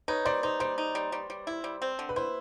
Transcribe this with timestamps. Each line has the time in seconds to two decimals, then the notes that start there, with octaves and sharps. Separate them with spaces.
0.08 D#4 B4 C#5
0.25 G3 C5 D5
0.43 D#4 C5
0.60 G3 C5
0.78 D#4
0.95 G3
1.12 G3
1.30 G3
1.47 E4
1.64 G3
1.82 C4
1.99 D3
2.09 B4
2.16 E4 C5